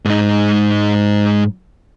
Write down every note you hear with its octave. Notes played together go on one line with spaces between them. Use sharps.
G#2 D#4